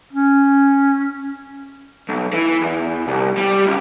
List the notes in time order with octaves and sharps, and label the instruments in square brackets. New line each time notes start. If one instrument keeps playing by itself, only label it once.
[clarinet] C#4
[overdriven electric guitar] B1
E3
E2
C2
G3
C#2